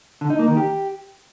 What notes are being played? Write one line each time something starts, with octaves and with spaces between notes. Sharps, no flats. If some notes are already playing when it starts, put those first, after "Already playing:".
D3
D#4
A#3
D#3
G4